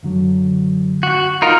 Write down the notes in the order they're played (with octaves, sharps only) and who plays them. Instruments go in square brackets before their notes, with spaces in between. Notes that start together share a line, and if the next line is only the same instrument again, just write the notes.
[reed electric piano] F#2 D3 F#3
[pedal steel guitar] F#4
[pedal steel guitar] D#4 F4 A#4 [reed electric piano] A#5